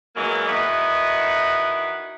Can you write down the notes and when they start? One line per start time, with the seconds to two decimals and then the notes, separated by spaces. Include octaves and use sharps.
0.16 E3 F#3 G#3 A#3
0.47 D#3 E4 F#4 B4 D#5